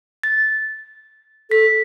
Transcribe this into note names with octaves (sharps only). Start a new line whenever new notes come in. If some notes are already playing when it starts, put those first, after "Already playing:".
A6
A4 B6